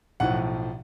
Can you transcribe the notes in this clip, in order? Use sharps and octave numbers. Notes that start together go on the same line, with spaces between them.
B1 A2 F3 F#5